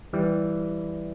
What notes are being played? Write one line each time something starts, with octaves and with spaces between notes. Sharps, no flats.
E3 G3